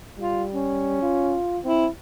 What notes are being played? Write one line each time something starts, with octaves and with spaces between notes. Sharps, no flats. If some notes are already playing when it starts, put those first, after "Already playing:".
G3 F4
C#4
F4
C4 E4